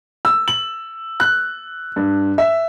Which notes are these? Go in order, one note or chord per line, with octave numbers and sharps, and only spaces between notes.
E6
F#7
F#6
G2
E5